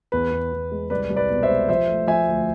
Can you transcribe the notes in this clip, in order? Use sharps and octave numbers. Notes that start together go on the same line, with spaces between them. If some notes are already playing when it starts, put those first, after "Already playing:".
E2 B4
E2
E2
G#3
C2 B4 D5
C2
B4 D5
B2
C5 E5
G#3
F3 C5 E5
A3
F3 E5 G#5
D2